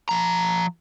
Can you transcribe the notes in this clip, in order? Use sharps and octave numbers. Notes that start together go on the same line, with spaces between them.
F3 A#5